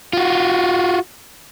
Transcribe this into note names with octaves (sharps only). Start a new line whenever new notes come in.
F4 F#4